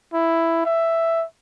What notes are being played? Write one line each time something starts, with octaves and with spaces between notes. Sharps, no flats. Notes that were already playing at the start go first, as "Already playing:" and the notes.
E4
E5